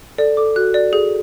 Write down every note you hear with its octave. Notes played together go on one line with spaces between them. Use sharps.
A4 D5
A4 D6
F#4 F#6
D5
G#4